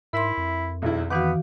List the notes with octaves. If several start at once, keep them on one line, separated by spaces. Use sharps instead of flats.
G#2 E4 A#4 E5 C6
F2
B1 E2 E4
D#3 E3 B3 F#4 F5 D6